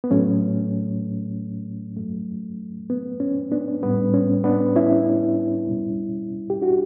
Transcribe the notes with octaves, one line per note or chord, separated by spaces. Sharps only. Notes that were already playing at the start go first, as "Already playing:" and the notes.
B3
A2 F#3 A3 C#4
G2 F#3 A3
B3
C#4
B3 D4
A2 G3 B3
C#4
B3 D4
C#4 E4
B2 G3
G4
D4 F#4